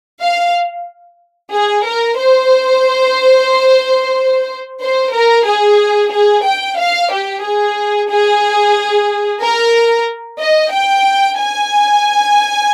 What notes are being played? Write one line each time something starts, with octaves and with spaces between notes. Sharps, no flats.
F5
G#4
A#4
C5
C5
A#4
G#4
G#4
G5
F5
G4
G#4
G#4
A#4
D#5
G5
G#5